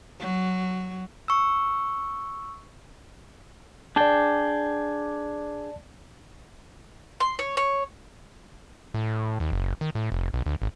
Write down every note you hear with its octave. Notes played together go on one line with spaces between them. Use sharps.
F#3
C#6 E6
D4 G#4 D5 G5 A5
C6
C#5
C#5
A2
D#2
F#1
D#3
A2
F1
B1
D2
G#1